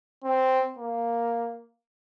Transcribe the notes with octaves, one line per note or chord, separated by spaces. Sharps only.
C4
A#3